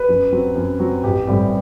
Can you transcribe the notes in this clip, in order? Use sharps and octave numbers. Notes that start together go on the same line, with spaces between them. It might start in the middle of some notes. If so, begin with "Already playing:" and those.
Already playing: B4
F#2
F#3 C4
F#2
F#3 C4
A1 G4
A2 G3 C4 G4